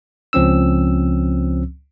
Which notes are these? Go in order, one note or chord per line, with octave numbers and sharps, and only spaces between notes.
C#2 F3 C4 C#4 E6